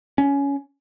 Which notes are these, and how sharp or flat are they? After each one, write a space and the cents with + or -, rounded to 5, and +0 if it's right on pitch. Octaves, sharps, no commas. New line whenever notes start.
C#4 +15